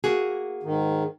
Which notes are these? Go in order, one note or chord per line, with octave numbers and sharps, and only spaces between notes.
A#3 F#4 G#4
G#2 D#3